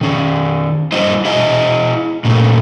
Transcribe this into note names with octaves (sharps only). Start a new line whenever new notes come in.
D#3 C#4
G3 E4 C5 D#5
E4 G#4 D#5
A#2 C#3 A3